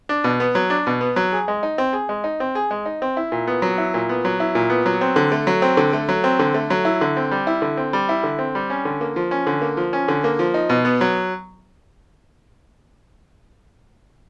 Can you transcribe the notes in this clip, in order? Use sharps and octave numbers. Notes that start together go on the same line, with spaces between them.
D4
B2
B3
F#3
D4
B2
B3
F#3
G#4
G#3
D#4
C4
G#4
G#3
D#4
C4
G#4
G#3
D#4
C4
E4
A#2
B3
F#3
E4
A#2
B3
F#3
E4
A#2
B3
F#3
C4
D3
A3
F#3
C4
D3
A3
F#3
C4
D3
A3
F#3
E4
D3
C4
G3
E4
D3
C4
G3
E4
D3
C4
G3
C#4
D3
A#3
F3
C#4
D3
A#3
F3
C#4
D3
A#3
F3
D#4
B2
B3
F#3